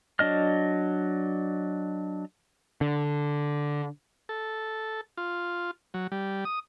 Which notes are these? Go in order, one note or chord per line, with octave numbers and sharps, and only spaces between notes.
F#3 D4 D#5 F6
D3
A4
F4
F#3
G3
D#6